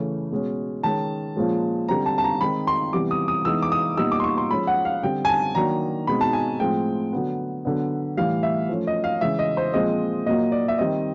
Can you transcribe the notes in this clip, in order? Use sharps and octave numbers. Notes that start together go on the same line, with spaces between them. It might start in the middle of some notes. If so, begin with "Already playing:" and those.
Already playing: C#3 E3 A3 C#4
B2 G#3 C#4
D#3 G#3 C#4 A5
A#2 F3 G#3 C#4
D3 G3 C4 A#5
A5
A5
A#5
D#3 G#3 C4 D#4 B5
C6
C3 E3 G3 B3 D6
D#6
D#6
E3 G#3 B3 D#4 E6
D6
D#6
A#2 G3 B3 D#4 E6
D6
C6
C#6
C6
F3 G#3 C#4 B5
F#5
F5
D3 G3 C4 G5
G#5
A5
D#3 F#3 A#3 D4 A#5
B2 G#3 C4 D#4 B5
A5
G#5
A2 F3 G#3 C4 G5
D3 F#3 B3
D3 F#3 B3 D4
A2 E3 G3 F5
E5
F3 A3 C#4
D#5
F5
C#3 E3 G#3 E5
D#5
C5
A#2 F3 G#3 C4 D#5
A#2 F#3 A#3 D#5
D5
E5
D#3 G3 C4 D#5